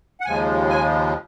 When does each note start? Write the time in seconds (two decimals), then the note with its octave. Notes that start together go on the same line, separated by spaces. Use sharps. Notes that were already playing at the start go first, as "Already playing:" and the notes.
0.20 F#5
0.25 D#2 C#3 F3 G#3 G#5
0.69 G#5